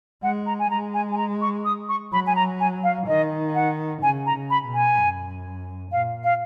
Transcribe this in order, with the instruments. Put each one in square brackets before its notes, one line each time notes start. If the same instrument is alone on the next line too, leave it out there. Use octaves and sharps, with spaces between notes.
[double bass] G#3 [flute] F#5
[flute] A#5
G#5
[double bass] G#3 [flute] A#5
[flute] G#5
G#5
A#5
C#6
D#6
C#6
[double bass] F#3 [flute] B5
[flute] G#5
A#5
G#5
F5
[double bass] D#3 [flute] D#5
[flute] F#5
[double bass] C#3 [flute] G#5
[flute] A#5
[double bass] C#3
[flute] B5
[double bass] B2
[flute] G#5
[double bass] F#2
[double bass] A#2 [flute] F5
[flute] F5